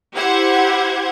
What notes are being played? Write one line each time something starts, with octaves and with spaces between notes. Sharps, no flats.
E4 G4 C5 F#5 G#6